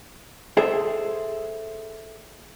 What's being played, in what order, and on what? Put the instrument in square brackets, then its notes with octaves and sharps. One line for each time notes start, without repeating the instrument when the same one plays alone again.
[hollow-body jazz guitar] G#4 A4 C5 E5